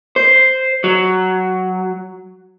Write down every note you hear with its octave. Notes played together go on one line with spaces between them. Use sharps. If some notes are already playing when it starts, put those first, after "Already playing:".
C5
F#3